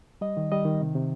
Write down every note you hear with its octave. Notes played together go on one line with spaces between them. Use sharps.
G3 D#5
D#3
G3 D#5
D#3
C3
C3